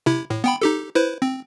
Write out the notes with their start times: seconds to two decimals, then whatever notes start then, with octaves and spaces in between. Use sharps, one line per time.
0.06 C3 E4
0.30 A2
0.44 B3 G5 B5
0.62 D#4 G4 A4
0.95 E4 B4 C5
1.22 C4